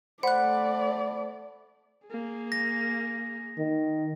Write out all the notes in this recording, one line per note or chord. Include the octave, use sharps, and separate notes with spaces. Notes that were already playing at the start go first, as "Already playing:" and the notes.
A3 C5 D5 F#5 B5 F#6
A#3 G#4
A#6
D#3